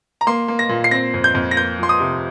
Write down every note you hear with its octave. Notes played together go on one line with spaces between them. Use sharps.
A#5
A#3 C6
A#3
A#6
A#2
C7
C4 A#6
F2
G6
F2
A#6
A#3 G6
F3 C6
D#6
C3